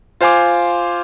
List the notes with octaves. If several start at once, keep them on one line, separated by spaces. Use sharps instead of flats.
F4 C5 F5 G#5 C6 D6